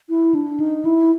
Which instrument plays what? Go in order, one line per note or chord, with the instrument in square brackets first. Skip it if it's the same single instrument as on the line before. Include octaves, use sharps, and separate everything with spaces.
[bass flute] E4
D4
D#4
E4